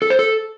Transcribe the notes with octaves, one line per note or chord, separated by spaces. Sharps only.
A4
C5
A4